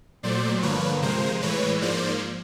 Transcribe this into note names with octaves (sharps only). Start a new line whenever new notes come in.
A#2 F#3 A3 C5 D5
G2 D3 F3 A#3 B4 C#5
C3 F3 G#3 A#4 C5
A2 E3 G#3 B4 C#5
G#2 F3 A#3 C5 D5